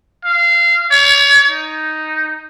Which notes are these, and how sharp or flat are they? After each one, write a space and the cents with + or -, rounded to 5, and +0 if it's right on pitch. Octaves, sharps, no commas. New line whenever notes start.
F5 -20
C#5 +35
D#4 +0